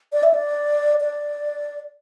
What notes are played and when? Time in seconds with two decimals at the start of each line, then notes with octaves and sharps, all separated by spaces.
0.13 D5
0.23 E5
0.34 D5
1.01 D5